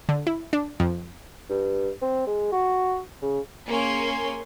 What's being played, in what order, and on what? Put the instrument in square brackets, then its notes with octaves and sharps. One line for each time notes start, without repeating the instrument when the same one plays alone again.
[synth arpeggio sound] D3
E4
D4
F2
[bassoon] G2
C4
G#3
F#4
C#3
[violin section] A#3 C#4 G#4 C#5 G#5 C6